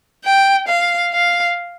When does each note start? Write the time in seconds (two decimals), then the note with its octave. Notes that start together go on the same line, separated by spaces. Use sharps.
0.25 G5
0.68 F5
1.12 F5